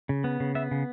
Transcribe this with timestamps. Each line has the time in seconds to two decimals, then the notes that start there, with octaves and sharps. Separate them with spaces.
0.09 C#3
0.24 B3
0.40 C#3
0.55 B3 E5
0.71 C#3